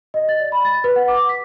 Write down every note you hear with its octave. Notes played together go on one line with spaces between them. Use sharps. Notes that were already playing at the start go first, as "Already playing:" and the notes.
D#5
A6
D5
B5
A6
B4
F#5
D6
B6